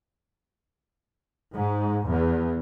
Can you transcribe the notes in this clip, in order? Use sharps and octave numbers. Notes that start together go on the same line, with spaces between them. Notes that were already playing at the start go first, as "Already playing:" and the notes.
G#2
E2